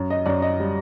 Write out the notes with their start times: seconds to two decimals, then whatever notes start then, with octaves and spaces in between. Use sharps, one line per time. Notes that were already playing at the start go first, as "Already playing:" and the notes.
Already playing: F#2
0.10 D#5
0.26 F#2 D5
0.42 D#5
0.60 G3